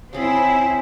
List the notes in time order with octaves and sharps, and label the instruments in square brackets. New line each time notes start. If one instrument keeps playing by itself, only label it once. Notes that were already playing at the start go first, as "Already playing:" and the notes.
[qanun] C#3 G#4 B5 [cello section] C4 E4